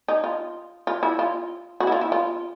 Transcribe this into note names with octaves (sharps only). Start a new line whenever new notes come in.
D#4
F4
F4
E4
F4
F#4
E4
F4
E4
F4